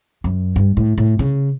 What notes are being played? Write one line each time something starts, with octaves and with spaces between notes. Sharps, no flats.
F#2
G2
A2
A2
C#3